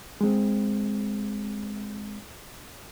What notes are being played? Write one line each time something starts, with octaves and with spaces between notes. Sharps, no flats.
G#3 C4